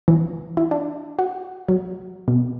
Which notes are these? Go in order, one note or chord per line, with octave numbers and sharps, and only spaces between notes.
E3
E4
D4
F#4
F#3
B2